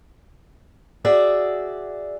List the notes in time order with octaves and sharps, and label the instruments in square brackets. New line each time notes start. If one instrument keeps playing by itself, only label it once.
[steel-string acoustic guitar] F#4 G#4 D5 E5